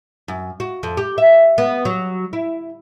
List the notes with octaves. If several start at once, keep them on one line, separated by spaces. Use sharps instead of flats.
F#2
F#4
F2
G4
E5
B3
F#3
E4